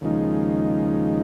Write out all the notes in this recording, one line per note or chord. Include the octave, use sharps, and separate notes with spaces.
D#2 C#3 F3 G#3 D#4